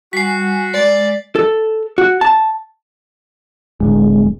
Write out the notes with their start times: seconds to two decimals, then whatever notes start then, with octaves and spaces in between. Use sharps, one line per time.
0.13 G3 F#4 F#5 G#5 B6 C7
0.74 G#3 D5
1.35 A4
1.98 F#4
2.21 A5
3.80 D1 G#3